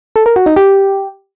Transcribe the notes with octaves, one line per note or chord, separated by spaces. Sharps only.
A4
A#4
F#4
D#4
G4